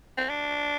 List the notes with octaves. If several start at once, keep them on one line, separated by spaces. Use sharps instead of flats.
C4
D4